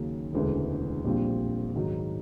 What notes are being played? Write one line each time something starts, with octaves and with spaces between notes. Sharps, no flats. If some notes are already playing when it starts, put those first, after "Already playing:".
Already playing: D#2 C#3 F#3 A#3 C#4
E1 D2 C#3 E3 G#3
A#1 A#2 G3 C4 F4
G#2 D#3 F#3